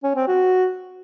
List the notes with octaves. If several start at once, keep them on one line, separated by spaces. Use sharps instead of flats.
C#4
C4
F#4